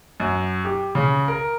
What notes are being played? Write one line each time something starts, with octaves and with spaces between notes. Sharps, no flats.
F#2
G4
C#3
A#4